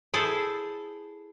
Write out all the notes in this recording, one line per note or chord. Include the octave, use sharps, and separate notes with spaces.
E4 G#4 A4 C5